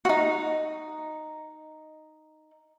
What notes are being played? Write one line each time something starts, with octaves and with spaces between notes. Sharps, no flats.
D#4 F#4